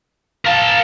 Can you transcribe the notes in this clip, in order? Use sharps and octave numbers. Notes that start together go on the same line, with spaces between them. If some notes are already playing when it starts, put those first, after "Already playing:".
A#4 F5 A5